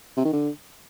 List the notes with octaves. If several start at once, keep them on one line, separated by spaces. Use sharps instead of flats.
C3
D#3
D3